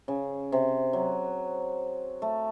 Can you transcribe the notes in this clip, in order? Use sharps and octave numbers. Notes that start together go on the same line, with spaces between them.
C#3
C3
F#3
A3